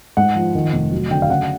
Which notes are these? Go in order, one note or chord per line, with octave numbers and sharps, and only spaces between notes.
G#2 F#5
F3
D#3
F1
F#3
D3 G5
F5
C#3 F#5